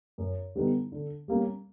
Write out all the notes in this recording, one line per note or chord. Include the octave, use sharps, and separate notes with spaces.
F#2
D3 G3 B3 D#4
D3
G3 A#3 C#4